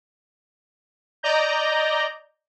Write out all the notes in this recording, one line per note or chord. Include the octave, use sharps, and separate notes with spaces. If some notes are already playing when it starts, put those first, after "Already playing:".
D5 D#5 A#5 G6